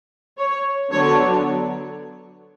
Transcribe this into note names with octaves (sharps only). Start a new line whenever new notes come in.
C#5
D3 F#3 B3 D4 C#5